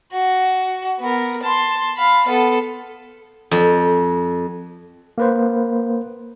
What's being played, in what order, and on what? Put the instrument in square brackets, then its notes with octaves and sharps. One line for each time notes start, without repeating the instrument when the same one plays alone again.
[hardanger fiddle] F#4
B3 A#4
A5 C6
F5 B5
B3 A4
[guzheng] F2
[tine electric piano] A#3 B4 C5